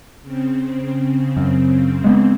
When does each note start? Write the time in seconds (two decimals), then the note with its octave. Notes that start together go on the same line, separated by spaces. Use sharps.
0.23 C#3 C4
1.37 F#2
2.04 G#3 B3